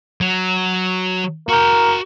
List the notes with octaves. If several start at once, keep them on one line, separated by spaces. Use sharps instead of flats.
F#3
F#4 A#4 G5